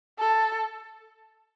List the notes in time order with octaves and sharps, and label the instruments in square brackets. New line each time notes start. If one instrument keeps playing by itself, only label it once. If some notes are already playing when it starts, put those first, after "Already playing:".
[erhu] A4